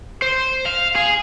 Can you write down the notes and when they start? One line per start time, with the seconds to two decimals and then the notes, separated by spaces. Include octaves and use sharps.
0.22 C5
0.66 F5
0.95 G#4